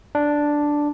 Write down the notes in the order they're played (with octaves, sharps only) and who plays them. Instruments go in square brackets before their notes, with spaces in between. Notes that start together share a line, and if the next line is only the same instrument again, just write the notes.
[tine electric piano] D4